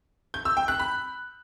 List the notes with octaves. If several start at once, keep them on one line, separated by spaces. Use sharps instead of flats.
G6
E6
G5
F#6
B5